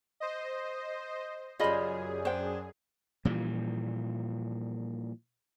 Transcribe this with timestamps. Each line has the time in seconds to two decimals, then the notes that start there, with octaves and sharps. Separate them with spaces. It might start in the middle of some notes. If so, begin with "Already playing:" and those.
0.20 C5 D#5
1.60 F#2 C#3 G3 F4 G#4 D#5 B5
2.25 D4 C5 G5
3.25 A#2 E3 F3 G3